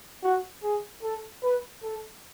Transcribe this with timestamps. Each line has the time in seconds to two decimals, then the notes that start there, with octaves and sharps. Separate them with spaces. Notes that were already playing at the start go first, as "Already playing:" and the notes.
0.23 F#4
0.63 G#4
1.03 A4
1.43 B4
1.83 A4